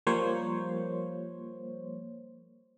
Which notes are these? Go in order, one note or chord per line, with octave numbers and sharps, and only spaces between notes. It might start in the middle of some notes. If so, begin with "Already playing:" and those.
F3 G3 A#3 C5 C#5